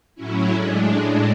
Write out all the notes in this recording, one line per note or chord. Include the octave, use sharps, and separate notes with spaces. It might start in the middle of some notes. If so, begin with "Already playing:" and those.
A2 F#3 C#4 E4
A2 G#3 D4